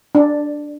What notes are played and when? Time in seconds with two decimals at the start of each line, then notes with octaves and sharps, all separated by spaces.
0.15 D4